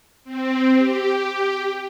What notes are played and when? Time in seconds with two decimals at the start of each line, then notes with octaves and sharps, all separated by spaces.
0.24 C4
0.73 G4